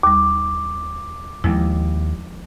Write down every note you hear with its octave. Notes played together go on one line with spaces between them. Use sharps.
D#2 G3 D6
D#2 F3 G#3 E4